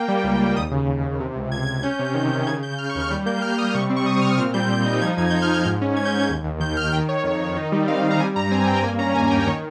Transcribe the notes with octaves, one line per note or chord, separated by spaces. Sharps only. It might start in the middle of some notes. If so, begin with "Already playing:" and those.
Already playing: A#3 G5
G3
C#2
G3
D#2 D#6
C#3
C#3
D#2
C3
C#2
C#2 G#6
G#6
C#2
G#6
C#4 G6
C3
D#3
D#3
C#3 G#6
C#3 G6
C#3 F6
C#6
D#2
F6
G3 G6
A#3 G6
A#3 F6
G3 D#6
C3 C#6
C4
C#6
C3 D#6
D#6
C4 F6
A#2 F6
G3 G6
G3
D#4
F3 G#6
F2 G#6
F2 G6
F6
F3
G6
G#2
C#4
G#2 G#6
G6
G#2 G#6
D#2
D#2
D#3 G6
D#2 F6
D#3 G5
D#3 C#5
F2
D#3
D#4
G3
C4 F5
G3
A#5
G3 G#5
G2 A#5
C4 G#5
G2 G5
A#3 G#5
C#4 A#5
D#2 G#5
C#4 G5
D#3 C#5